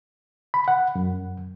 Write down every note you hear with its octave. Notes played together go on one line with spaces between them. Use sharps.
B5
F#5
F#2